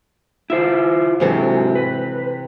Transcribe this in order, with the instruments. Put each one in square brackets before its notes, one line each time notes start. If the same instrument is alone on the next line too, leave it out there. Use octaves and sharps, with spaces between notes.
[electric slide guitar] E4 F4 C5 [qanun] E5
[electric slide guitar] G#2 F#3 [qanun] C3 E3 A4
[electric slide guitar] B4